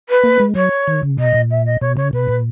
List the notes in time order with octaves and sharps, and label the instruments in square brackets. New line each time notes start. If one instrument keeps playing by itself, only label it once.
[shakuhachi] B4
[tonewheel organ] A#3
G#3
[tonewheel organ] F#3 [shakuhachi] C#5
[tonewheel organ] D#3
C#3
[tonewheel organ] B2 [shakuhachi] D#5
[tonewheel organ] A#2
[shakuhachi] E5
D#5
[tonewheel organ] B2 [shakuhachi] C#5
[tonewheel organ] C#3 [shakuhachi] C#5
[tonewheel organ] B2 [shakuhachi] B4
[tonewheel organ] A#2